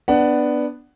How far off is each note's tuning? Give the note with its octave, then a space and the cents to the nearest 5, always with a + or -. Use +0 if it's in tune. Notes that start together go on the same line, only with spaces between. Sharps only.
B3 +0 D4 +5 F#5 +15